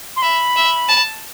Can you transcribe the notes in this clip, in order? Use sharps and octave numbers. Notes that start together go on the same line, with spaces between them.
C6
E5 B5
E5
A5